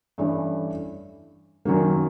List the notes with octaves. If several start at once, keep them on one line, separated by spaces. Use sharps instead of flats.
G2 E3 A3 C#4
F#2 D#3 F#3 A#3